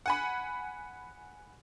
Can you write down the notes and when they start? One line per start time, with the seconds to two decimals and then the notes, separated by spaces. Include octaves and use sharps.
0.06 F#5 G#5 B5